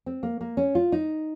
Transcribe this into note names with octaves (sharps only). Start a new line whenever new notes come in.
C4
A#3
A#3
C#4
F4
D#4